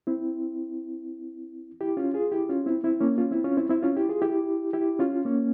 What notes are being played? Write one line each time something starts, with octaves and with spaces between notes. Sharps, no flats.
C4 E4
E4 G4
C#4 F4
F4 G#4
E4 G4
C#4 F4
C4 E4
C4 E4
A#3 C#4
C#4 F4
C4 E4
C#4 F4
C4 E4
C4 E4
C#4 F4
E4 G4
F4 G#4
E4 G4
E4 G4
C#4 F4
A#3 C#4